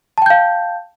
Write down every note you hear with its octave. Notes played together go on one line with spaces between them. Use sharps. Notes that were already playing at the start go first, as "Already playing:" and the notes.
F5 G5 A5 G6